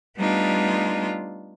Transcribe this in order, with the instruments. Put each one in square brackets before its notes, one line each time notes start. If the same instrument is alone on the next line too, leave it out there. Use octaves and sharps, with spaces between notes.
[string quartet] G3 A3 B3 D4 D#4 F4